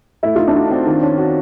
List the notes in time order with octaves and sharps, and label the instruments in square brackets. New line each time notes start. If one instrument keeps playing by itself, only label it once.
[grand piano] A3 [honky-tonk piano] E4
[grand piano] D#4 [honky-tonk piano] F4
[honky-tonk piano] D4 E4
[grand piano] F#4
C4
D#3
C#4
F#4